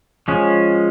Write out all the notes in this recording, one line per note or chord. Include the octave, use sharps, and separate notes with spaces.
F3 G#3 C#4